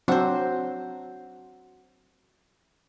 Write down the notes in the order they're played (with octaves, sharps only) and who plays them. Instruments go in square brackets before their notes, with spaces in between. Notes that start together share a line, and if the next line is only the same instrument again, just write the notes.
[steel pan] F#3 C4 D4 [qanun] F#4 C5